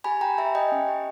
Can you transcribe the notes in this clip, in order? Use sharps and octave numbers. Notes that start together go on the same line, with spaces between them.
G4 G#5 B5
G4 G5 A#5
G4 E5 G#5
G4 D#5 G5
C#4
G4